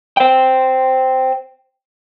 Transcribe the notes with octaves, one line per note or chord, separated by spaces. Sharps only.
C5 G5